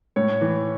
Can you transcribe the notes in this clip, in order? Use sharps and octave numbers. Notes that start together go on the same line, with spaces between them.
A2 C#5
E3